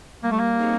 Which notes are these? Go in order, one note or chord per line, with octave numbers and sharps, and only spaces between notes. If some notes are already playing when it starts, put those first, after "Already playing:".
G3 A#3
A3
A#3
C4 D#4 G#4 C#5